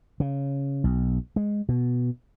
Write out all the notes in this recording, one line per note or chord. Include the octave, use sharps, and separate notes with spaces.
C#3
B1
G#3
B2